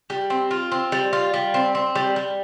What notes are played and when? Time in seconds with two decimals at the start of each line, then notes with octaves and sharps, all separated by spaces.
0.10 G3
0.30 C4
0.51 F4
0.72 C4
0.92 G3
1.13 F4
1.34 G3
1.54 C4
1.75 C4
1.95 G3
2.16 G3